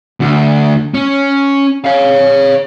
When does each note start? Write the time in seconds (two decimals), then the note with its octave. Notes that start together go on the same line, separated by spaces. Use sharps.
0.20 D2 D3
0.94 C#4
1.84 C#5 F5